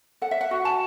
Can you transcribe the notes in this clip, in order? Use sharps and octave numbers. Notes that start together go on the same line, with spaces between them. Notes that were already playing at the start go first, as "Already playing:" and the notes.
A4 F#5
E5
F#5
F#4
A5